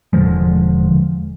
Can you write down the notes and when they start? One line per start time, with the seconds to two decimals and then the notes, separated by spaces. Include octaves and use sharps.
0.13 E1 D3 F3 G#3